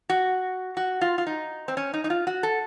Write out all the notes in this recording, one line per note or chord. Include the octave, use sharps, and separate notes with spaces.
F#4
F#4
F4
F4
D#4
C4
C#4
D#4
D#4
F4
F#4
A4